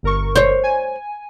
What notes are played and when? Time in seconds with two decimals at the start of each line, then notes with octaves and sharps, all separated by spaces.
0.03 G1 A#4 C#6
0.36 C5 C#5
0.63 G#5